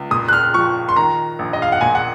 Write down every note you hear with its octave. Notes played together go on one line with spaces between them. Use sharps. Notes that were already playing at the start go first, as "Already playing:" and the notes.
Already playing: C#2
A#2 D#6
F#6
F6
F3 C#6
C6
D#3 A#5
A#1
D#5
F5
F#5
A#2 G#5
F#5